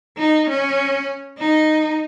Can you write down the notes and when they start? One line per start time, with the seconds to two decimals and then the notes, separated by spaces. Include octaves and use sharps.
0.17 D#4
0.49 C#4
1.38 D#4